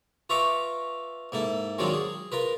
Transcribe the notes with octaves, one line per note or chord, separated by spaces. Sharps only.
F4 B4 E5 A#5 C#6 D6
G#2 A#3 E4 A4
D#3 F#3 G#3 C4 D4 F4
G#4
F4 A#4 B4